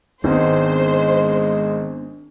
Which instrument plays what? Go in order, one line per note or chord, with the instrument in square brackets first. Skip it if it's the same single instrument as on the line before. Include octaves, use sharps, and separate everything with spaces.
[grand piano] G#1 D#4 [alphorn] G#3 [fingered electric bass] B3 C4 D4 [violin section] C5